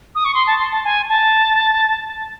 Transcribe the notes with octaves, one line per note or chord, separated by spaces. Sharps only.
D#6
C#6
C6
A5
C6
A5
G#5
A5